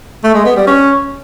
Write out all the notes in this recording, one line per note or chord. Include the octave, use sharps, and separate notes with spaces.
A3
G#3
B3
G3
C#4